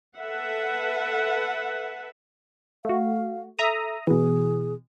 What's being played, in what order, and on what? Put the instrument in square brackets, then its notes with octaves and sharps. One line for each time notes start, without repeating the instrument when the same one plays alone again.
[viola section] A4 B4 E5 F#5
[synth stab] A3 F#4 [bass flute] F5
[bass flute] A4 [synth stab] E5 A#5 D#6
[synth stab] B2 E3 [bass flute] G#4